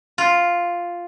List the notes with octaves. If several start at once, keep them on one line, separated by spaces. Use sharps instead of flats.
F4